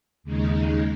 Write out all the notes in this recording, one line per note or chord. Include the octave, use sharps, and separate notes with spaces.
D#2 C#3 G#3 D#4